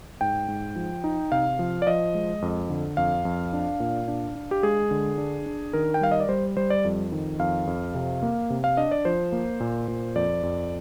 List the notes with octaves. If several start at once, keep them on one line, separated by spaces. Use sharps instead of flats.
G#2 G5
G#2
F3
D#4
C3 F5
F3
D5
F3 D#5
G#3
F2
D3
F2 F5
F2
D4
A#2
D4
D4
G4
G#3 G#4
D3
D4
D4
D#3 A#4
G5
G3 F5
D#5
D5
G3 C5
G3 C5
D5
F2
D#3
F2 F5
F2
C3
A#3
C3
F5
D4 D#5
D5
F3 C5
A#3
A#2
A#2
F2 D5
F2